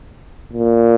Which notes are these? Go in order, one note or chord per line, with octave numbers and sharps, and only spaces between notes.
A#2